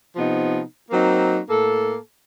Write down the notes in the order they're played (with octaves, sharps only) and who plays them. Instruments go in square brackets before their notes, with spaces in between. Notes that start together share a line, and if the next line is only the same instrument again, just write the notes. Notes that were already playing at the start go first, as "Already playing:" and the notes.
[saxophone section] C3 F3 B3 D#4
F#3 A#3 C4 D#4
A2 A#3 A4